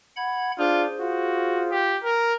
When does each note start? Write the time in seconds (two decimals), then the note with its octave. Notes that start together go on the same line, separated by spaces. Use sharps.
0.16 F#5 B5 G#6
0.59 D4 F4 G#4 C5
1.00 F4 F#4
1.71 G4
2.04 A#4